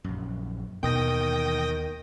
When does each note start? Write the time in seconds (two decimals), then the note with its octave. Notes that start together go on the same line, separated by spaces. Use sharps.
0.04 A#1 F#2
0.83 D#2 B2 D#3 E3 B3 G5 D#6 A#6